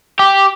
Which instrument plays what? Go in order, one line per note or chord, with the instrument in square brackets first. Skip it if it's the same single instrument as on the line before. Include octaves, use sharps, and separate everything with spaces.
[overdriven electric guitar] G4